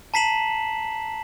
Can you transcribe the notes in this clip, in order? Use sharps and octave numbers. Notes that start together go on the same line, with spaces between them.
A5 A#5 B6 C7 E7 F#7